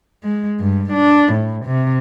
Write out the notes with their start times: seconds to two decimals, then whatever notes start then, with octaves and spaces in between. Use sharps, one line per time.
0.23 G#3
0.60 G2
0.93 D4
1.33 A2
1.66 C3